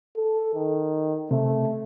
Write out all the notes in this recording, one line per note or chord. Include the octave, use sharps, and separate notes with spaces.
A4
D#3
C3 A3